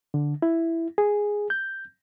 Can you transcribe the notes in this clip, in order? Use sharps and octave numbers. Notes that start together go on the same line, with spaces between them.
D3
E4
G#4
G6